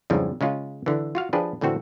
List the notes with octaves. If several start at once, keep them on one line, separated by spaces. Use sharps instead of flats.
F2 G#2 C#3 E3 F3 G3
C#3 G#3 C#4 F4
D3 E3
F4 F#4 F5
F3 D4 G4 G#4 B4
A2 D3 E3 C4 F#4